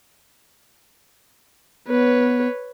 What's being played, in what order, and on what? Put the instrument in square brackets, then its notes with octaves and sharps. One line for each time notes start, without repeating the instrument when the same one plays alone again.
[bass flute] B3 [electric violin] B4 C#5